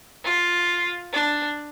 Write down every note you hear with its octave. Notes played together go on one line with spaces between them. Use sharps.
F4
D4